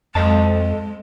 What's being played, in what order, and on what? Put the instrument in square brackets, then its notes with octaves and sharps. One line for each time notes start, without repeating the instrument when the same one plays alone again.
[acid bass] F2 [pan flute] G#3 [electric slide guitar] A4 D#5 A5